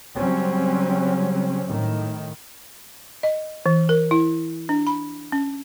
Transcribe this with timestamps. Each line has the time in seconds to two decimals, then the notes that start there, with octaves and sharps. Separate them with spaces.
0.17 C#3 F#3 G3 C4 C#4
1.68 A2 D#3
3.23 D#5
3.66 E3
3.89 A#4
4.11 E4
4.69 D4
4.87 B5
5.32 C#4